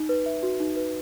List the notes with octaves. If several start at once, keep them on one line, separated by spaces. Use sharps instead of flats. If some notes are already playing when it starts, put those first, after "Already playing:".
Already playing: D#4
B4
E5
F#4
D#4
B4